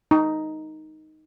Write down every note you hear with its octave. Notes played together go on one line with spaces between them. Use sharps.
D#4